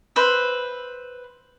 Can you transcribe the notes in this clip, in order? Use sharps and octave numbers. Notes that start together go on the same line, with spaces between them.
B4 C5 E5